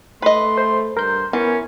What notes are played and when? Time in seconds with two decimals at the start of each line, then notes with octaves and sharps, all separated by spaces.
0.22 A3 B4 D#5 C6
0.58 C5
0.97 G2 A#4 C5 G6
1.33 E3 B3 C#4 A#4